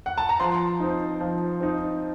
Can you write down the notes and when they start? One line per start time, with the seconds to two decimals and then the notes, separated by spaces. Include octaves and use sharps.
0.06 F#5
0.18 A5
0.29 A#5
0.40 F3 C6
0.80 C4 D#4
1.20 F3
1.60 C4 D#4